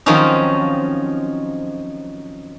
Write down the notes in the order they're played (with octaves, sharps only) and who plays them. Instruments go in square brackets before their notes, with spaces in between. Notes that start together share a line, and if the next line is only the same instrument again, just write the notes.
[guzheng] D#3 F3 F#3 C4 C#4 D#4